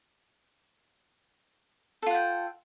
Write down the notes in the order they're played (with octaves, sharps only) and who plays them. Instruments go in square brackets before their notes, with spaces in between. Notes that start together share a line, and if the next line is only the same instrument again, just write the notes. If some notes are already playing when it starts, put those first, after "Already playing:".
[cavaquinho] A4
F4
F#5
G5